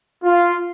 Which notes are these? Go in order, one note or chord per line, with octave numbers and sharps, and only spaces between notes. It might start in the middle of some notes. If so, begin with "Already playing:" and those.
F4